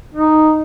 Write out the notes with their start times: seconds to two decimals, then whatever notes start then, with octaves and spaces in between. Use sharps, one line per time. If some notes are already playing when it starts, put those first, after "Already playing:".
0.14 D#4